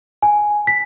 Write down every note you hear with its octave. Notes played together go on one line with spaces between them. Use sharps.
G#5
B6